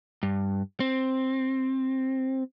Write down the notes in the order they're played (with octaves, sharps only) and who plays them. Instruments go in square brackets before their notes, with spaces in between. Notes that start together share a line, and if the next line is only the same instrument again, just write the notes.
[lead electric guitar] G2
C4